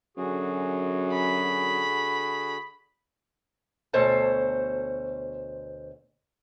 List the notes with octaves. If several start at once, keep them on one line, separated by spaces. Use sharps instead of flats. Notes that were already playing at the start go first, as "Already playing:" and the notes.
F#2 D3 F#4 G#4
B5
D2 B2 A4 C5 C#5 A5